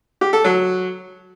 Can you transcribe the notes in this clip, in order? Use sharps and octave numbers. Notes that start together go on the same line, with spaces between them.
G4
A4
F#3